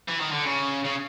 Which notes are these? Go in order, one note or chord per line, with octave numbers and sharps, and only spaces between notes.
E3
D#3
D3
C#3
C#3